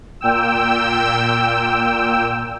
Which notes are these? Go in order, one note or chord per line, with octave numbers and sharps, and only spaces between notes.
A#2 G5 E6